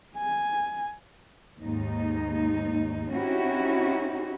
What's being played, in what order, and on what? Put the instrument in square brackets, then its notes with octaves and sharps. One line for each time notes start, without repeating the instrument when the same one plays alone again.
[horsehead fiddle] G#5
[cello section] D#2 G#2 D#4
C4 C#4 D#4 E4 F#4 G4